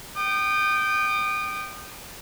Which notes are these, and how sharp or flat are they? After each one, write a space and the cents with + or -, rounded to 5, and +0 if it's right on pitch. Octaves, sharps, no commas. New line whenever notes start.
G5 -15 D#6 -35